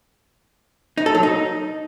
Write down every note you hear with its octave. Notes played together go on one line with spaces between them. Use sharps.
D#4
A4
F#3
D#4